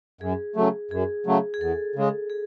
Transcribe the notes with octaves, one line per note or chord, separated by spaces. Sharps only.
F#2 G#4
C#3 F#3 A3
F#2 G#4
C#3 F#3 A3
G#4
E2 A4
C#3 G#3
G#4